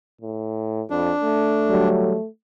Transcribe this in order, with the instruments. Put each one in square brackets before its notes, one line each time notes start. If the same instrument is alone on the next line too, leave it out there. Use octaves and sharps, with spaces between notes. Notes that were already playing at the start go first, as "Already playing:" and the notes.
[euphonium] A2
[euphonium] F2 [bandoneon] D4
[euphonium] A3
[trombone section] D3 F#3 G3